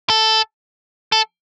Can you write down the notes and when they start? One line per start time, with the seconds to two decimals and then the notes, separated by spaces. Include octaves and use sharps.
0.10 A4
1.12 A4